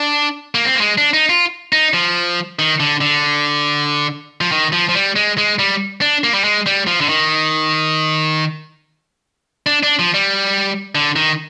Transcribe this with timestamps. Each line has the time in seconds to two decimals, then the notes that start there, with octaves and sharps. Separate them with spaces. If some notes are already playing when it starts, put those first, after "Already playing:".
Already playing: D4
0.55 A#3
0.65 C4
0.75 A#3
0.81 G#3
0.98 D4
1.13 D#4
1.29 F4
1.73 D#4
1.94 F3
2.59 D#3
2.80 D3
3.01 D3
4.41 F3
4.52 D#3
4.73 F3
4.89 F3
4.95 G3
5.16 G#3
5.38 G#3
5.59 G3
6.01 D4
6.24 A#3
6.34 G3
6.44 G#3
6.66 G3
6.87 F3
7.01 D3
7.09 D#3
9.66 D4
9.83 D4
9.99 F3
10.14 G3
10.95 D3
11.16 D#3